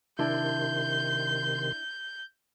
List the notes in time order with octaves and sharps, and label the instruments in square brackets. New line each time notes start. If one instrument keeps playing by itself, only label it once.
[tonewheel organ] C3 D#3 C6 [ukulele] D4 E4 [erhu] G6